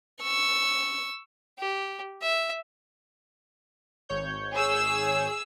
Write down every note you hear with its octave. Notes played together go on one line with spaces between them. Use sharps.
C#6 E6
G4
E5
G#1 C#5 G6
G#4 E6